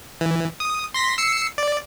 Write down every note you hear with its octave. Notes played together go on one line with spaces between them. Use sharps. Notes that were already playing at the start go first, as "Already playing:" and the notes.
E3
D#6
C6 A#6 B6
E6 C7 C#7
D5